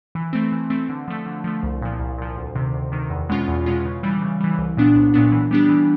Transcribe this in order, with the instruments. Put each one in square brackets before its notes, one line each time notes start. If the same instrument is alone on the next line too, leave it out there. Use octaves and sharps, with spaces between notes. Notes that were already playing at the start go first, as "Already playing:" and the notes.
[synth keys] E3
A3 C4
E3
A3 C4
D3
F3 A3
D3
F3 A3
C2
A#2 F3
C2
A#2 F3
D2
C3 D#3
D2
C3 D#3
E2
B2 G#3 C#4 F4
E2
B2 G#3 C#4 F4
C#3
E3 G3
C#3
E3 G3
C2
A#2 F#3 B3 D4
C2
A#2 F#3 B3 D4
E3
G3 B3 D4 G4
E3